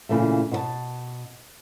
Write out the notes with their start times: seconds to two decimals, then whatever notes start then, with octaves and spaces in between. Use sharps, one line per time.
0.09 A#2 C#3 E3 A3
0.51 B2 C#5 A5